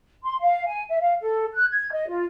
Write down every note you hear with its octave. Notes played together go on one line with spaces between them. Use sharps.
C6
F5
G#5
E5
F5
A4
F#6
G#6
D#5
F4